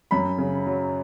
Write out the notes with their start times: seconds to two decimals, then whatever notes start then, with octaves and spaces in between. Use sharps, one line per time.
0.11 F#2 B5
0.38 C#3
0.67 F#3